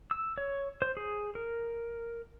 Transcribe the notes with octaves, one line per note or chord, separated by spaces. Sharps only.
E6
C#5
C5
G#4
A#4